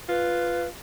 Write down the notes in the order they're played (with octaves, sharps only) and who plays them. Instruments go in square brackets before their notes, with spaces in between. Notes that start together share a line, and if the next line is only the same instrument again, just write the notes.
[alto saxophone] F4 [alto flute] B4